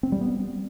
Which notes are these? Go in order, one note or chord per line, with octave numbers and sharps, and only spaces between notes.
C4
G3
B3